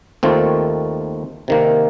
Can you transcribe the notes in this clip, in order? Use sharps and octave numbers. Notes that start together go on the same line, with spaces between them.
D#2 D#3 A3 C4 F4
C3 D#3 A#3